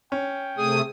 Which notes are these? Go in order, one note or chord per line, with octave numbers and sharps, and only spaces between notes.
C#4 G5
C3 A3 G#4 D#6